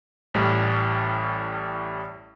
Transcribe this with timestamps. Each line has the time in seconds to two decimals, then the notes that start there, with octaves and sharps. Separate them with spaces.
0.34 A1 A2 G3